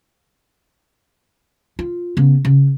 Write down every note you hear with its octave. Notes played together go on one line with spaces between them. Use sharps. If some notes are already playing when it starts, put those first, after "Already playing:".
F4
C#3 B3
C#3